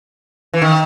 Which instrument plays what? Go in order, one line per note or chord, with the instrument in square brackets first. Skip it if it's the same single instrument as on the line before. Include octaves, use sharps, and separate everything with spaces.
[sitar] E3
D#3